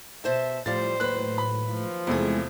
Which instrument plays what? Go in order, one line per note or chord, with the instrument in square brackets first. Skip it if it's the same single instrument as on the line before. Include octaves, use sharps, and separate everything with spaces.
[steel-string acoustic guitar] B2 C5 A5 [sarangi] E5
[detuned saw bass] A2 [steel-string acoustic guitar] F3 G3 [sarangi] C5 [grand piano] A6
[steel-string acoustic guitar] D#2 F#3 B4 [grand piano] F#6
[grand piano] B5
[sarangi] F3
[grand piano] E2 C3 A3 [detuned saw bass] G#3 [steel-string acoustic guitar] E4 G#4